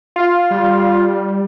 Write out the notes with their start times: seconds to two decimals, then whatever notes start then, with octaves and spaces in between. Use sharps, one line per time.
0.16 F4
0.51 G3